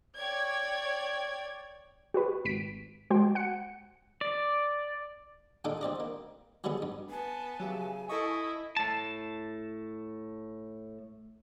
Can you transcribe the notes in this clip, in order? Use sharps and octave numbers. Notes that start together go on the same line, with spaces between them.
C#5 D5 G5 G#6
F#4 G4 B4
G#1 B6 D7
G#3 F#4 C5 G5
F#5 C#7
D5
A#2 D#3 A#3 D4 A4
D2 C4 D5 D#5
A#3
F#3 G3 A3 B3 G#4
G2
B3 G#5 A5
C#3 F#3 G4 E5
E4 A4 D#5 A5 C#6 D#6
A2 A5